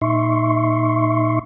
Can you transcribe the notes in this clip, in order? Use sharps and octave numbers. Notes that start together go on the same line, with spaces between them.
A#2 D#4 E5 C6 C#6